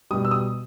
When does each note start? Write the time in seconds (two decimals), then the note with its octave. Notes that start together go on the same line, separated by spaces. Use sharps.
0.11 B2 G3 D#6
0.25 E6
0.31 D#6